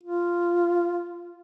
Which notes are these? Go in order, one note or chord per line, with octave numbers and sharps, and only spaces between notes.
F4